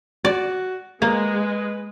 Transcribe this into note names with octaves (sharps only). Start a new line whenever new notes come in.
F#4 D5
G#3 A#3 B4